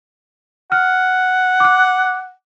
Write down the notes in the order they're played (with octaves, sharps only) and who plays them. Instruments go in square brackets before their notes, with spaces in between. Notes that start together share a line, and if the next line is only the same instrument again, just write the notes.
[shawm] F#5 [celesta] F6
[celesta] D6 F#6